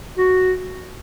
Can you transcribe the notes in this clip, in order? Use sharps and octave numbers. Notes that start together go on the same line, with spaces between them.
F#4